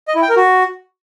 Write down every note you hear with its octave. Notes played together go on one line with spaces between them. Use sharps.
D#5
E4
G5
A#4
F#4